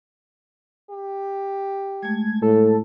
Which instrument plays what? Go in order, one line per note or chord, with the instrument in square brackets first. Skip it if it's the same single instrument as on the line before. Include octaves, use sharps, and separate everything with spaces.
[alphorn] G4
[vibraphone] G#3 A3 [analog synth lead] G#6
[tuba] A2 [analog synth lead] A4